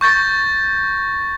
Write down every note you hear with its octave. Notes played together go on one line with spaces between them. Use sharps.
C#6 G6 A6 A#6